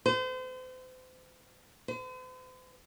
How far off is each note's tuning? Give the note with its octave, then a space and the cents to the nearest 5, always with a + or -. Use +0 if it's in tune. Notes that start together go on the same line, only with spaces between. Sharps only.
C5 -40
C5 -45